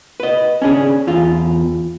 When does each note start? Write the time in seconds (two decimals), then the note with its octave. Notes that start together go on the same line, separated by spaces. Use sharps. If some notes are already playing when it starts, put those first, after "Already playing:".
0.20 B4 D#5
0.62 C#4 D4 G#4
1.07 E2 F4